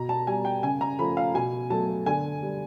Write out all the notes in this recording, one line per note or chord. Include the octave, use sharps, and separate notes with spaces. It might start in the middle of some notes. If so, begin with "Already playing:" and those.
Already playing: B2 A#5
A5
G3 G#5
G5
C#3 G#5
A#5
F3 A3 B5
F5
B2 G#5
F#3 A3 A5
D3 G#5
G3